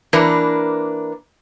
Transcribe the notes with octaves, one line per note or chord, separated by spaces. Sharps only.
E3 A#3 D4 A#4 B4